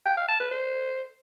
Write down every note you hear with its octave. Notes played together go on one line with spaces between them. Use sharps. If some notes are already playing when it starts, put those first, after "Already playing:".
G5
F5
A5
B4
C5